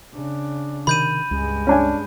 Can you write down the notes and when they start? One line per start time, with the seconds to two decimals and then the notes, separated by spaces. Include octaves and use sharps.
0.13 C#3 D4
0.87 C3 D#3 B5 G6 D#7
1.31 C#2 G2 G#3
1.67 C#4 D4 G#5